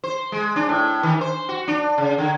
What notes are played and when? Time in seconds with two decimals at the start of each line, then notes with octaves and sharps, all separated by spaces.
0.04 C5
0.32 G#3
0.56 D4
0.69 A2
1.03 D#3
1.21 C5
1.49 F#4
1.68 D4
1.98 C#3
2.18 D3